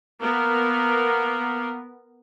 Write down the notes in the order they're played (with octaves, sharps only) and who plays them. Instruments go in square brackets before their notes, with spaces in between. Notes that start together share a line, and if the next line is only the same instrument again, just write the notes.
[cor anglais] A#3 [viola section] B3 A#4